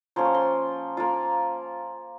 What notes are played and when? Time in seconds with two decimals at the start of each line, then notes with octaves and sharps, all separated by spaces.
0.16 F3 A#3 C#4 C6
0.25 C#6
0.34 C6
0.97 A#3 F4